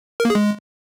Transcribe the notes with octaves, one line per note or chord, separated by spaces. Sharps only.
A#4
A#3
G#4
G#3